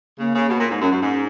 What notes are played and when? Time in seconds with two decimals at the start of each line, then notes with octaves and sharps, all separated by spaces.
0.19 C#3 A#3
0.35 C#3
0.49 B2
0.60 A#2
0.71 G#2
0.81 F#2 C#4
0.92 F#2
1.02 G#2